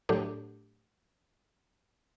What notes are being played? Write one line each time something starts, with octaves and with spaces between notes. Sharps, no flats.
A2 F#3 A3 D4 G4